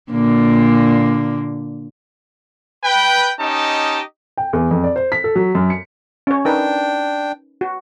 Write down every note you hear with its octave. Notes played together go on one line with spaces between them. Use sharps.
A#2 D3 A#3
B4 G5
C#4 D#4 G4 D#5 A5
G5
E2
F2
D5
C5
B6
A4
F#3
F#2
C#7
C#4 C#5
D4 D#4 A#4 B4 G5
F#4